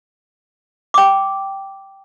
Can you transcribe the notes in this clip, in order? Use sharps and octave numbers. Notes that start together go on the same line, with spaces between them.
G5 D6